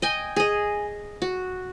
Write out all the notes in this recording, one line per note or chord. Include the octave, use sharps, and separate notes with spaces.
D#5 G5 G#5
G#4 D#5
F#4